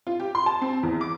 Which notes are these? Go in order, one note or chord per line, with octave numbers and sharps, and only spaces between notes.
F4
G4
C6
A5
C4
E2
D6